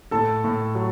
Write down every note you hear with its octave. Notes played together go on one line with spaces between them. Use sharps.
A2 A4 A5
A2
F#3